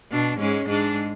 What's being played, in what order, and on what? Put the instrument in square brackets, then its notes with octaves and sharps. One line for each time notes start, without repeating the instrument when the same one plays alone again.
[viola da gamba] B2 [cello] D4
[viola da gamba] G#2 G#3 [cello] C#4
[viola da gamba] G#2 G#3 [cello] D4